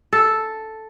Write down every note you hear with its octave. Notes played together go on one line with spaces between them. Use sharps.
A4